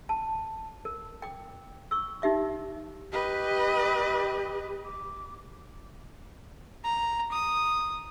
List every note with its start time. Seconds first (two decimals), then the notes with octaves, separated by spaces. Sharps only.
0.09 A5
0.85 A#4
1.22 G5 D6
1.91 C#6 E6
2.22 D#4 G4 E5 D6
3.12 G4 B4 D#5
4.85 D6
6.84 A#5
7.32 D#6